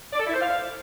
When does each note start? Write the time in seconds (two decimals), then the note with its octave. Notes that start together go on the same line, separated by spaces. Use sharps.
0.13 D5
0.20 A4
0.27 E4
0.34 C5
0.41 F5